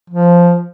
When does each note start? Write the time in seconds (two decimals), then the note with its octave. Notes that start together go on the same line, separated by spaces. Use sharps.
0.10 F3